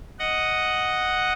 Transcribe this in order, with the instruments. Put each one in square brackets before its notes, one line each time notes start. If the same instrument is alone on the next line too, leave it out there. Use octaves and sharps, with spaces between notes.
[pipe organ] D#5 F#5